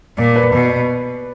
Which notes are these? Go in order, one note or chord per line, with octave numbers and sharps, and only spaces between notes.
A#2 D5
B4
B2